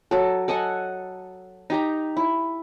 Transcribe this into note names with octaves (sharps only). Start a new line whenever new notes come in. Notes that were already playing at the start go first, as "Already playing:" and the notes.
F#3 A4
A4 D#5 F#5 G#5
D#4 G4 A#5
E4